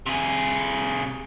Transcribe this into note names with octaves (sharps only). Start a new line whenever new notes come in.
C3 G#4